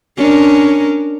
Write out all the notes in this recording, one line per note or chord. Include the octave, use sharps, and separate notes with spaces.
C#4 D4 A#4